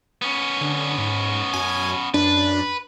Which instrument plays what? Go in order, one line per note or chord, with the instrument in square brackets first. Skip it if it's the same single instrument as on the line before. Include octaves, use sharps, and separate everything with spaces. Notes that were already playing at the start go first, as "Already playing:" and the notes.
[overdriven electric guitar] B3 C#4
[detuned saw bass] D3
G#2
[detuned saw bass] F#2 [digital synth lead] G#5
[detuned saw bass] F#2 [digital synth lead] D4 [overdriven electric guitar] B4